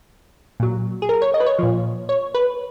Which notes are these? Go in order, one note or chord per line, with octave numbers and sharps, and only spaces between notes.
A#2 F#3
G#4
A#4
C#5
D#5
B4
C#5
A#2 F3
C#5
B4